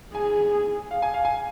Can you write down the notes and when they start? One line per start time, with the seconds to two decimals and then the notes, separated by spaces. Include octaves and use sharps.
0.14 G#4 G#5
0.91 F5
1.02 G#5
1.14 F5
1.25 G#5